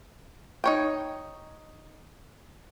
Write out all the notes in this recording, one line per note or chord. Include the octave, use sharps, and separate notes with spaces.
D#4 C#5 G5